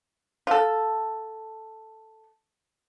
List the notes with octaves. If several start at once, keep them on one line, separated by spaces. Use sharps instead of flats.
F4 A4